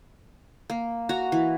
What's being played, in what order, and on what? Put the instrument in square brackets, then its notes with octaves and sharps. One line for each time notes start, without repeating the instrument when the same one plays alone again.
[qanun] A#3
F#4 A#5
E3